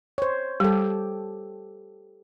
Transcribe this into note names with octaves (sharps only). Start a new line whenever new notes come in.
C5 C#5
G3 G4 A4